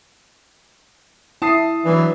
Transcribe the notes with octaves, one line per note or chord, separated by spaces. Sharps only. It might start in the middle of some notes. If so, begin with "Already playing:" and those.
E4 A5 D#6 C7
E3 F#3 D4